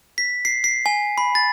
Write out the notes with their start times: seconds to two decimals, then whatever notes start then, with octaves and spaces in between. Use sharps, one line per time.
0.18 B6
0.45 C7
0.64 C7
0.86 G#5
1.18 B5
1.35 A6